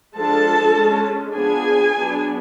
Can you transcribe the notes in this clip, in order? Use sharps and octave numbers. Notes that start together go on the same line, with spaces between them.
F3 G#3 D4 A4 A5
G#3 C#4
F3 B3 D4 G#4 G#5
F#3 B3 D4